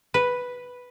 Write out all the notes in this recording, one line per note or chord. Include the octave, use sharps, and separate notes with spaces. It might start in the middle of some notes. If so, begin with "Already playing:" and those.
B4